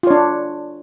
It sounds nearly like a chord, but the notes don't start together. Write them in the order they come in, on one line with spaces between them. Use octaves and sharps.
F4 C#5 D4